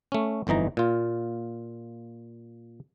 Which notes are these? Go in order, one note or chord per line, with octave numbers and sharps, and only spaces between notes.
A3 C#4
G1 F2 E3 D#4 A#5
A#2 F4